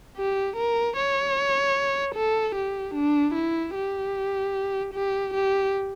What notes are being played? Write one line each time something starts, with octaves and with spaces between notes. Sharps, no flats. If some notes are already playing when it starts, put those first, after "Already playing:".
G4
A#4
C#5
A4
G4
D4
E4
G4
G4
G4